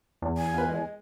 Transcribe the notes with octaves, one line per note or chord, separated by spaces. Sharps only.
E2
G#5
F4 B4
G#3